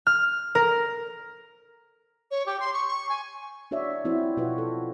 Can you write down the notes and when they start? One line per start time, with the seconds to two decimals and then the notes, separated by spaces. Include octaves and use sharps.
0.07 F6
0.55 A#4
2.30 C#5
2.46 G4
2.59 C6
2.73 C#6
2.87 C#6
3.09 G#5
3.71 D4 F#4 C#5 D5 E5
4.05 F3 C4 E4 F#4 C5
4.37 B2 F4 F#4 B4 C5
4.58 A4